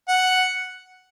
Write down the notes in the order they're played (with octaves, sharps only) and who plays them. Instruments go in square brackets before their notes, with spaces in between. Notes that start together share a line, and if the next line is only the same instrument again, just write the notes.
[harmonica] F#5